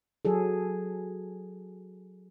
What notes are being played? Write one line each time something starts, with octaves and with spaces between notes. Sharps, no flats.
F#3 G#4 A4